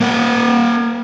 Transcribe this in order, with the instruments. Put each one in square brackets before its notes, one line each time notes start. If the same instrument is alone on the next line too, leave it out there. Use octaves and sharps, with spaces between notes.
[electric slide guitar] A#3 A#4 F#5